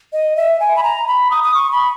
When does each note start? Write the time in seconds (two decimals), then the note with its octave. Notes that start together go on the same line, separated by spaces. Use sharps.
0.13 D#5
0.36 E5
0.60 G#5
0.76 B5
0.83 A#5
1.07 B5
1.31 D#6
1.43 D#6
1.54 C#6
1.72 B5